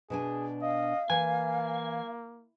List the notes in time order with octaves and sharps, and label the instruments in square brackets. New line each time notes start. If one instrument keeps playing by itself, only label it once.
[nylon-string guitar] B2 D4 G#5 [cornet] G#4
[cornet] D#5 [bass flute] F5
[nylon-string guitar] E3 [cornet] A#3 [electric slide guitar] G#5